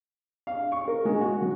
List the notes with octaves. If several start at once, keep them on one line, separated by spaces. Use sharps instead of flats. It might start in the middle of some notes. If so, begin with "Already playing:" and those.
F5
C#6
A#4
G#3
F#4
F#3